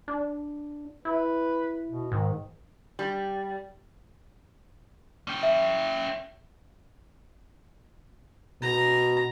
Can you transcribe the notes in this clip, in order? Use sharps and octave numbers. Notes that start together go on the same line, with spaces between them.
D4
E4 B4
B2
G#2 D#3
G3
C#4 G5
E5
B2 A#5